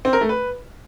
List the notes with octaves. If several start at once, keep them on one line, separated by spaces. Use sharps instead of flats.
C4
A#4
A3
B4